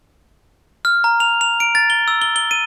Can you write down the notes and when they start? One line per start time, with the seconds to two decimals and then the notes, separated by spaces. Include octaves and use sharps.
0.85 F6
1.04 A#5
1.20 F7
1.41 F7
1.60 D7
1.75 A6
1.90 G7
2.08 E6
2.22 G7
2.36 G7
2.51 D#7